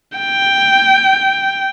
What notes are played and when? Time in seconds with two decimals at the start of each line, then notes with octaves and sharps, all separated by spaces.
0.18 G5